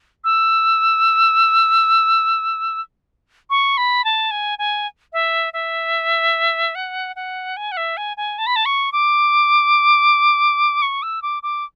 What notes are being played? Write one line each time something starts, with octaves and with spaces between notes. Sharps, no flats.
E6
C#6
B5
A5
G#5
G#5
E5
E5
F#5
F#5
G#5
F#5
E5
G#5
G#5
A5
B5
A5
C#6
D6
C#6
E6
D6
D6